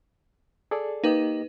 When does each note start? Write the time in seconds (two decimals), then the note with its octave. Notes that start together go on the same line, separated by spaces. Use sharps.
0.71 G#4 A4 D5
1.04 A#3 D#4 G4 B4 D#5